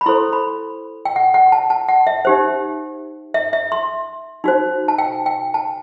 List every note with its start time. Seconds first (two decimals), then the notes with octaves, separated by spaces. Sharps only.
0.01 B5
0.06 E4 A4 C5 C6
0.33 B5
1.05 G5
1.16 F#5
1.34 F#5
1.52 A5
1.70 A5
1.88 F#5
2.07 E5
2.25 D#4 G4 C5
3.34 E5
3.53 E5
3.72 C6
4.44 D#4 F#4 C5
4.88 A5
4.98 G5
5.26 G5
5.54 A5